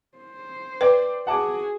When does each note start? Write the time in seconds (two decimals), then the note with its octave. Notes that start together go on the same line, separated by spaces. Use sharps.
0.18 C5
0.81 B4 D5 G5
1.27 F#4 G#4 F#5 A5 D6